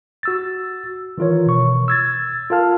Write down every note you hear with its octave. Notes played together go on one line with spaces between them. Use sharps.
F#4 E6 A6
D#3 E3 F4 A#4 C#5
B2 C#6
E6 G#6 A6
F4 A4 A#4 F5 A5 F6